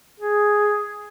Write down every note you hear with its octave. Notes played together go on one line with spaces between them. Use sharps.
G#4